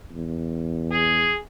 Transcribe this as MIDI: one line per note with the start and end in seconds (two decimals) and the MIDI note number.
0.11 1.31 40
0.91 1.38 68